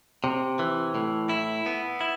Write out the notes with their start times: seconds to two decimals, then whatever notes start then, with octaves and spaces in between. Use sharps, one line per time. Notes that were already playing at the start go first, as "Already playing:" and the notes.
0.24 C3
0.59 E3
0.95 A2
1.29 E4
1.66 B3
2.01 E4